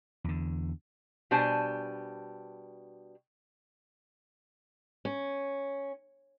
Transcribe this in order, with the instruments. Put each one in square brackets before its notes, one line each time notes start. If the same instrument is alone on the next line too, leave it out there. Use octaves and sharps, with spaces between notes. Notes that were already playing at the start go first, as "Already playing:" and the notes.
[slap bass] E2 D3
[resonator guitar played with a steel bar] B2 G3 D4 C5 G#5 A5
[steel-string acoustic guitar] C#4